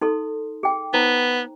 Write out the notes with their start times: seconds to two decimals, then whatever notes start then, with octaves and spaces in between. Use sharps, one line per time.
0.01 D#4 A4 C6
0.63 G#4 G5
0.94 B3 D#4 C5 A#5